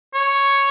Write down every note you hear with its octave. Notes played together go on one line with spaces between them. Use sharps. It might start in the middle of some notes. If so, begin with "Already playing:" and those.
C#5